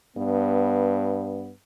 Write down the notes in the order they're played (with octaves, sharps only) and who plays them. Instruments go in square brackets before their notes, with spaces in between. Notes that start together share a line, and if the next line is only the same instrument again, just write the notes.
[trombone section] G2 B3